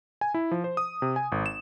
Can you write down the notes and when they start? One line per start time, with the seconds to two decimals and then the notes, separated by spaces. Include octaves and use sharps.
0.21 G#5
0.34 E4
0.51 F3
0.64 C5
0.77 D#6
1.02 C3
1.16 G#5
1.32 G#1
1.46 E7